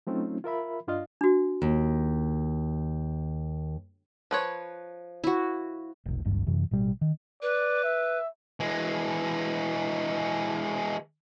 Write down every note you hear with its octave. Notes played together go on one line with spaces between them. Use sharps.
F#3 A3 C4 C#4 D#4 F4
F4 A#4 E5 B5
G2 D4 F4 D#5 F5
D4 F#4
D#2
F3 B4 C#5
E4 F#4
F1 B1
D1 G#1 C#2 G2
F#2 C3 E3
A1 B2 G3
D#3
B4 D5
E5
E3 G#3